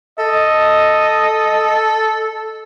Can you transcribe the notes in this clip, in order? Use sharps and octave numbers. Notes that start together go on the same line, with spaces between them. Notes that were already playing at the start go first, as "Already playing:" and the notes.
A4 D#5